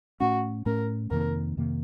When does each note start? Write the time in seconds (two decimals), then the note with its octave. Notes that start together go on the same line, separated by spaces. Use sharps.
0.20 A2 A3 C#4 F#4
0.66 A2 A3 C#4 A#4
1.11 F2 C3 D#3 A#3 A#4
1.57 F2 C3 D#3 A#3